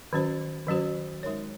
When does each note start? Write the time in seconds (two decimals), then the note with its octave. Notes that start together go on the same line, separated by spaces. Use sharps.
0.13 D#3 F#3 C#4 F#4 C5
0.67 D#3 F#3 C#4 F#4 C5
1.23 G#3 D#4 A#4 C#5